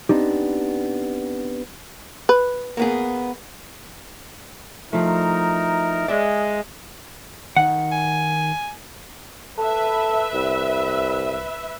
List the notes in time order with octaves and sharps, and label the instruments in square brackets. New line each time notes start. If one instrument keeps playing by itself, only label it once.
[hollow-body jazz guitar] B3 C4 D4 D#4 G4
[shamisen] B4
[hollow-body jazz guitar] A#3 B3 G#4
[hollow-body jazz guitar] F3 A3 [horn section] D#4 E4 A#4
[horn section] G#3 [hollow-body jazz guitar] D5 E5
[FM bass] D#3 [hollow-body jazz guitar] F#5
[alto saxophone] G#5
[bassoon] A4 [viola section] B4 E5
[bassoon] C2